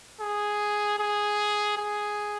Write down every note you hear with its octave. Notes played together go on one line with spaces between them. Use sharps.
G#4
G#4
G#4